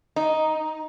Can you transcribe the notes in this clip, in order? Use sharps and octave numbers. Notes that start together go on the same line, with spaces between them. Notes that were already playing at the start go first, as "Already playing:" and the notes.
D#4